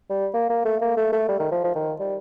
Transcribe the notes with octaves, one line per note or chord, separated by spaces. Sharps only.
G3
A#3
A#3
A3
A#3
A3
A3
G3
D#3
F3
F3
D#3
G3